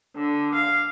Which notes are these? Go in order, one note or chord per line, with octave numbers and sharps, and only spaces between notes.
D3
F5